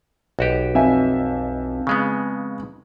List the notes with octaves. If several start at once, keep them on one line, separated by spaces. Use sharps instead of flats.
B1 F#4 G4
F2 E5 G#5
C#3 G#3 B3